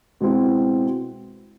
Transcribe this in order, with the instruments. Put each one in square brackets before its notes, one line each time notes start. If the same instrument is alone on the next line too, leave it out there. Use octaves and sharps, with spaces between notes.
[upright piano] B2 G#3 C4 E4